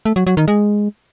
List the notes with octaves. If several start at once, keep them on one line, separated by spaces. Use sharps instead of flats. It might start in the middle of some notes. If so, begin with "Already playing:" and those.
A3
F#3
F#3
D#3
G#3